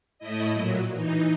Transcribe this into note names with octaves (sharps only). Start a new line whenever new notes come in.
A2 A3 E4 D#5
A#2 F#3
E3 D#4